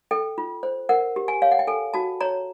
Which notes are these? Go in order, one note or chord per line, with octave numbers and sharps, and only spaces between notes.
A4 G5
F4
C5
A#4 F#5
G4
G#5
C#5 F5
F#5
G5
A4 G#5
F#4 A5
C#5 A#5